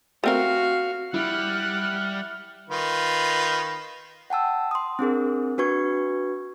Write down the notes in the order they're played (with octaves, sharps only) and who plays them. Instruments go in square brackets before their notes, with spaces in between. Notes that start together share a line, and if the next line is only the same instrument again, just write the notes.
[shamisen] A3 C4 A#4 [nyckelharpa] F#4 F5
[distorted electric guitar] G3 [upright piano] E4 [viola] F#5 [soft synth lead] F6
[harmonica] D#3 F4 B4
[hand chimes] F#5 G5 A5 E6
C6 D#6
C4 D4 G#4 A#4
D4 F#4 B4 C#6 G#6